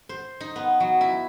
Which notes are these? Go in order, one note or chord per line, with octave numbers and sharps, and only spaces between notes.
C5
D#4
B3
F#3
E4